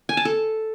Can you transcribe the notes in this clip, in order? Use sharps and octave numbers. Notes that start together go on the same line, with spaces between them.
G#5
A5
A4